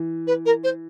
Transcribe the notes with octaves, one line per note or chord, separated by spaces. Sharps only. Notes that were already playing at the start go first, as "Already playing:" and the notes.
Already playing: E3
B4
A#4
C5